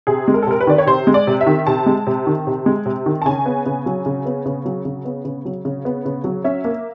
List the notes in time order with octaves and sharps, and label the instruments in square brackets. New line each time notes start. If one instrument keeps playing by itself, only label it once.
[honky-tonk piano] C3 G#4
G#3
A#4
A4
C3 A#4
B4
D#3 D5
C#5
C3 C5
G#3
D5
C3
E5
D#3
C3 A5
G#3
C3
D#3
C3
G#3
C3
D#3
A5
C#3 G#5
B3
C#3
F#3
C#3
B3
C#3
F#3
C#3
B3
C#3
F#3
C#3
B3
C#3
F#3
C#4 E5
A#3